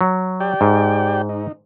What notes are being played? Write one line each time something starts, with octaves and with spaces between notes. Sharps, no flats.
F#3
G4 D5 G5
G#2
D#4